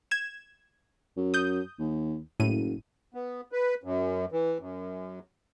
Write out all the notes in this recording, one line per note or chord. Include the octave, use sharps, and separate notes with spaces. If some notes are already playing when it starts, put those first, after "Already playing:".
G#6 E7
F#2
D#6 G6
D#2
F#1 A2 D#7
B3
B4
F#2
E3
F#2